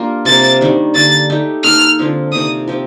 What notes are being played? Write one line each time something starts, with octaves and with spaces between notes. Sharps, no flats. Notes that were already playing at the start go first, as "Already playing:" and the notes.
Already playing: A#3 D4 F4 G4 A#4
C3 F3 A#3 A6
D#3 G3 D4
D3 G3 A#3 A6
A3 D#4 G4
D#3 A#3 D#4 A4 F6
D3 F3 C4 F4
C3 D#3 A#3 D#6
F3 C4 G4